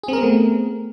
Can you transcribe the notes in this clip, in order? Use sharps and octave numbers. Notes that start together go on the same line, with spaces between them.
A3 B3 C4 G#4 A#4